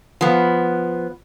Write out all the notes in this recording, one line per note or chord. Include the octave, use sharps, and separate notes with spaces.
F3 B3